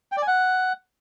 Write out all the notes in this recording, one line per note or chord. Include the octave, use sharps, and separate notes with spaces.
G5
D5
G#5
F#5